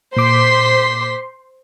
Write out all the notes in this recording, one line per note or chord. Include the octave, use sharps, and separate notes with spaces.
A#2 C5 C6 D6 B6